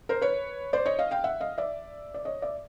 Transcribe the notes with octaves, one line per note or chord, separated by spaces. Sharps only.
A#4 C5
B4 C#5
C5 D5
C#5 D#5
D#5 F5
F5 G5
E5 F#5
D#5 F5
D5 E5
D5
C#5 D#5
D5 E5